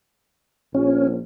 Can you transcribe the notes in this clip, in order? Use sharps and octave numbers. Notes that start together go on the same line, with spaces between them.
A#1 C#4